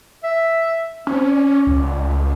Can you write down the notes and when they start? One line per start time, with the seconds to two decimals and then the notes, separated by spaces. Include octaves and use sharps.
0.23 E5
1.07 C4 C#4
1.29 D5
1.67 C#2